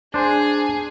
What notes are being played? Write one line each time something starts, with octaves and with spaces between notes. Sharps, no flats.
D4 G#4 C5